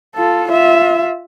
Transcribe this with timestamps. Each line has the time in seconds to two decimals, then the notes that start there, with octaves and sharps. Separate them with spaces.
0.15 F4 A4
0.49 F4 E5